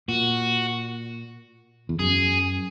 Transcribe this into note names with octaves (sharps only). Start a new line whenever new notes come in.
A#2 F#4
E2
F#2 G#4